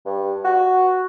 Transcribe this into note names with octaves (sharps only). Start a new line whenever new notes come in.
G2
F#4